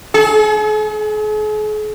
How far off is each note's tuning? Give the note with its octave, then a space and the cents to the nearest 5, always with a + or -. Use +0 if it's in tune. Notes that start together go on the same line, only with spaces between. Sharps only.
G#4 +45